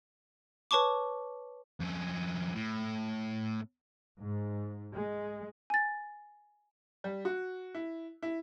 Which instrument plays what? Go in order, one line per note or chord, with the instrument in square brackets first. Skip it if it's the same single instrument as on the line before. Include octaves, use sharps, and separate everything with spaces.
[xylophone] B4 C#5 A5 C#6 D6
[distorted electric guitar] F2 C#4
A2
[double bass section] G#2
G#3
[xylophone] G#5 A6
[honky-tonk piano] G3
F#4
E4
E4